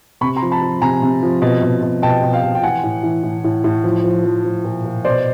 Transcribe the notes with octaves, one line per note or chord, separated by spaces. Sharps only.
C3 B5 C#6
A#5 C6
F3
A5 B5
F3
C3 G#5 A#5
C3
F3
B2
B2
B2
B2 G5 A5
B2
F5 G5
B2
G5
E3 F#5 G#5
A2
E3
A2
A2
A2
F3
F3
F3
F3
A#2
A#2
B2 C5 D5